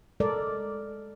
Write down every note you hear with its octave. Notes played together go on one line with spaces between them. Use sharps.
G#3 A4 A#4 D5